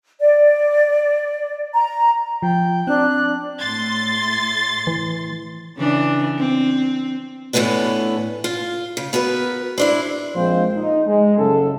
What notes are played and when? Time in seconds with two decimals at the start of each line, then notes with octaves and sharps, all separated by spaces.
0.20 D5
1.74 A#5
2.42 F3 G5
2.87 C4 D4 F#6
3.60 A2 C6 A6
4.87 E3
5.77 C#3 E3 D4
6.38 C4
7.53 A2 E3 F#3 A3 B3 D4
8.44 F4
8.97 C#3
9.13 B3 F#4 A#4 B4
9.78 C4 D4 E4
10.34 A#1 F3 G#3 C4 C5
10.75 D#4
11.07 G#3
11.37 F#1 F#2 C#3 A4